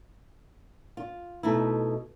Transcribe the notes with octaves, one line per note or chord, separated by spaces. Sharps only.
F4
B2 A3 D#4 E4